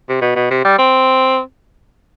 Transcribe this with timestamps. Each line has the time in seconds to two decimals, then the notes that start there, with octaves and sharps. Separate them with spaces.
0.09 C3
0.21 B2
0.35 B2
0.51 C3
0.65 G3
0.78 C4